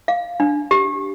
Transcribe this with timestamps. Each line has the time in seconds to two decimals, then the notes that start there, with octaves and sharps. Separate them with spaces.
0.08 F5
0.40 D4
0.71 G4